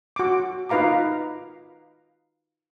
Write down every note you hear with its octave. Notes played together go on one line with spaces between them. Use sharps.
F#4 D6
D#4 F4 B4 F5 A#5 D6